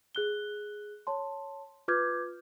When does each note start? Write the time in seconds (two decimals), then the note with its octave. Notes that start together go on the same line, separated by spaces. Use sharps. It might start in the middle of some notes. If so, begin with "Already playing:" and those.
0.15 G#4 F#6 G7
1.07 C#5 A5 C6
1.88 F4 B4 D6 F6 G6 G#6